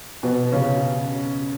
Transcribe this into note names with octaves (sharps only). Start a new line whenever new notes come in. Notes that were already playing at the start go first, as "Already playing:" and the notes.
B2 B3
C#3 C#4